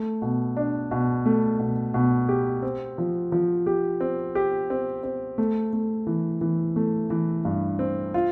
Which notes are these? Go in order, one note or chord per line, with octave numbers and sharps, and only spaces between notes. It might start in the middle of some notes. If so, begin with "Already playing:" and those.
Already playing: A3
B2
D4
B2
A3
B2
B2
G4
C4
F3
F3
G4
C4
G4
C4
C4
A3
A3
E3
E3
A3
E3
G2
C4
F4